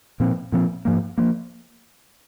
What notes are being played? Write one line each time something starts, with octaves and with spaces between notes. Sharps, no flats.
A#2 F3 C4
A#2 F3 C4
G#2 F3 A#3
F3 A#3